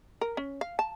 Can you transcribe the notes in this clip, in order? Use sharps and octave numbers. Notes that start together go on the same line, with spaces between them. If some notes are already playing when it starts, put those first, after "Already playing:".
A#4
C#4
F5
A5